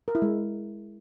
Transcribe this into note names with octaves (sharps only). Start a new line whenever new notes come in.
A#4
E4
G#3